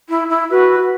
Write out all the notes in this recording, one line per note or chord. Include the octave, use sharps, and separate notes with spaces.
E4
E4
F#4 B4